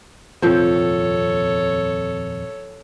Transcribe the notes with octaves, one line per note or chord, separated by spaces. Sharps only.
D#1 F2 C3 F3 C4 A4 C#5